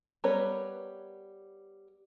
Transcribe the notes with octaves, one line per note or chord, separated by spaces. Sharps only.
G3 B3 A#4 B4 C#5